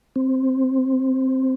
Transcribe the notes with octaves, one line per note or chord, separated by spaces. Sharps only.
C4